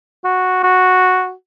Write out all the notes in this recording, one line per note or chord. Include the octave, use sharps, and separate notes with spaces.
F#4
F#4